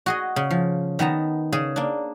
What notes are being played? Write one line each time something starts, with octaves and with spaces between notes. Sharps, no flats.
F#4 G#4 D#5
C#3
F3
D#3 B3 A5 A#5
C#3 G#4
A#3 D4